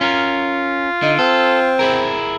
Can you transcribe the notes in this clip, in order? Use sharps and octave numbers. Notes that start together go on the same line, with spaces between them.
C#4 F4 A#4
D3 D#4
C4 A4
E4 G#4 A#4